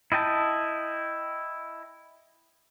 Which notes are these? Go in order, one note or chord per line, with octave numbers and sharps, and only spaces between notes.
E4 D#5 G5 A5